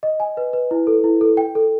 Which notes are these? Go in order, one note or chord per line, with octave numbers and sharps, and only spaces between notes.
D#5
G#5
B4
B4
E4
A4
E4
A4
G5
A4